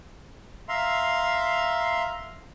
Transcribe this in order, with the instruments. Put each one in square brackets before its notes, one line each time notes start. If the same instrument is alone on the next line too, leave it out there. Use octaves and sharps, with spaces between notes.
[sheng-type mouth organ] E5 F5 A#5 C6